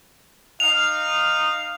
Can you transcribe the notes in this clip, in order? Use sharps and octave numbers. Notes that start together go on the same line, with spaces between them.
D#4 F5 F7